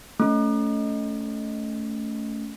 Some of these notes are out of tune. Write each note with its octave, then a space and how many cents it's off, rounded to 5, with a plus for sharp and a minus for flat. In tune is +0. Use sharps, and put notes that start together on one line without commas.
A3 +0 C#4 +20